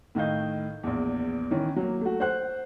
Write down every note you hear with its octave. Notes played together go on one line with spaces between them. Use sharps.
A2 D#3 D#5 F5 G6
A#1 E2
D#3 E3 C#4
F#3 A#3
A3 F#4
C5 F#5 F#6